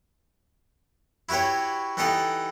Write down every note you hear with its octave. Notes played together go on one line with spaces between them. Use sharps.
E4 F#4 G4 B4 C#5
E3 D#4 G4 A4 F#5